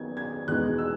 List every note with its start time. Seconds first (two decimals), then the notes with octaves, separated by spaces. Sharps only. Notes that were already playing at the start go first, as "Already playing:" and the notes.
Already playing: F#2 D#3 F#3 B3 G#6
0.17 G#6
0.47 E2 B2 G#3 D#4 F#6
0.78 E6